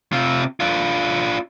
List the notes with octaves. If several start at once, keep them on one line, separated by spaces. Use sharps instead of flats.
C3 F4
D4 F4